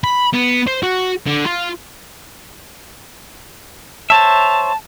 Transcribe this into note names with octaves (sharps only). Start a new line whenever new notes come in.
B5
B3
C5
F#4
D3
F4
C5 C#5 E5 A5